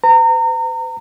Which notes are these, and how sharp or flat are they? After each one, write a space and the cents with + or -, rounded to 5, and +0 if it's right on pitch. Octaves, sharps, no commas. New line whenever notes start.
B4 +45 A#5 -30